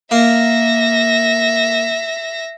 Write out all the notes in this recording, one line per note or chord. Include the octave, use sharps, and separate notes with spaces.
A#3 E5 A#6